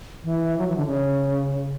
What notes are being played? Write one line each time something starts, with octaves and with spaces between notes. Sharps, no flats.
E3
F#3
E3
D3
C#3